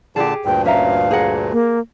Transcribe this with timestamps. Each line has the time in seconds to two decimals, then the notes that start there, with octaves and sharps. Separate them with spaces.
0.16 A#2 D3 G4 G#4 A5
0.45 D2 G2 A#2 G5
0.66 C#4 E5 F5 A#5
1.11 G#4 A#4 F#5
1.52 A#3